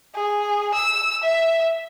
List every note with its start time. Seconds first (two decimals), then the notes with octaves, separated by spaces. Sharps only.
0.15 G#4
0.74 E6
1.24 E5